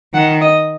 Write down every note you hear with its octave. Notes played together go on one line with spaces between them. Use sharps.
D#3 F#5
D#5